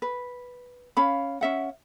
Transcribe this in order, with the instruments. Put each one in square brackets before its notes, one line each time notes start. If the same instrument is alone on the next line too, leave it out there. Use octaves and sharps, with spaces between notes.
[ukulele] B4
C#4 F5 B5
C#4 E5 F#5